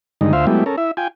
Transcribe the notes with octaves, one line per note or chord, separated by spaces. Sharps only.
G2 D3 D#3 G#3 D#4
D2 F4 C5 E5 F5
F#3 G#3 A3 B3 E4 G4
C#4 A4 A#4
E4 E5
F4 G5 G#5